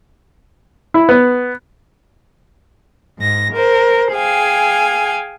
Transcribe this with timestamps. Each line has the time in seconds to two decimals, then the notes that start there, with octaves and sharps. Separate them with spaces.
0.94 E4
1.09 B3
3.20 G#2 A#6
3.53 A#4 C5
4.13 G#4 F5 G5 G#5